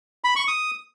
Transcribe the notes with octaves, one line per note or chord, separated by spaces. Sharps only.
B5
C#6
D#6